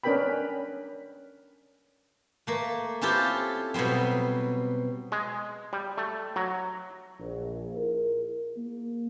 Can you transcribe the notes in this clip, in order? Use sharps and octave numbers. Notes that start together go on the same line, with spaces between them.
C#4 D4 A#4 B4 G5 B5
A3 A#3
C4 C#4 E4 F4 G4 A4
B2 F#3 G3 B3 C4
G#3
G3
A3
F#3
A#1
E4 F4 G#4 A#4
A#3